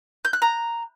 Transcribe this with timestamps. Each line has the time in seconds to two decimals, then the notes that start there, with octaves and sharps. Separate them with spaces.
0.25 G6
0.33 F#6
0.42 A#5